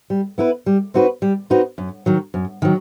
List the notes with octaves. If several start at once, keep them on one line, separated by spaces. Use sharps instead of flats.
G3
B3 E4 B4
G3
C4 D#4 F#4 B4
G3
C4 D#4 F#4 B4
F#2
D#3 F#3
F#2
D#3 F#3